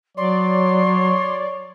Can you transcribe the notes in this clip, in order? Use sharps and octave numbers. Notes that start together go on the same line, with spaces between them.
F#3 C#5 D5 C6